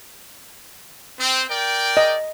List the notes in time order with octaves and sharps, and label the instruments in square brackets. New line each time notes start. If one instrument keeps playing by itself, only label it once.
[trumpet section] C4
A#4 D5 G5
[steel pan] D#5